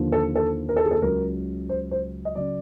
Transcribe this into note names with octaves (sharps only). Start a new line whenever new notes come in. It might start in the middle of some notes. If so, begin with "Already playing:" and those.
Already playing: D#2 D3 F3
A4
A4
A#4
A4
G#4
A4
C#2 C#3 F#3 A#4
C5
C5
D#5
C#3 F#3 D5